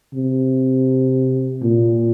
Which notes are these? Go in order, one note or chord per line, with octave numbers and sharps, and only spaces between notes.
C3
A#2